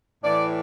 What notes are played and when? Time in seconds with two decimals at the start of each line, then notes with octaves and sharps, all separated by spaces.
0.24 A2 E3 D5